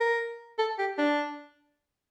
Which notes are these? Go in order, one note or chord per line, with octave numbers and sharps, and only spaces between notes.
A#4
A4
G4
D4